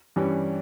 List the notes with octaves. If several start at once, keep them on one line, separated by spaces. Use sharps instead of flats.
G2 E3 G3 C#4